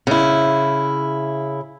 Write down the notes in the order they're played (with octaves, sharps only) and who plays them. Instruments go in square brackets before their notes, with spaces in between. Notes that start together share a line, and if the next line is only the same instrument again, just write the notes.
[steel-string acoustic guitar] C#3 E4